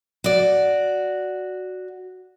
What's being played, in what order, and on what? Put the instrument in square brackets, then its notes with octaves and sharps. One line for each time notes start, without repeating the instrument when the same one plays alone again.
[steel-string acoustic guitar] F#4 D5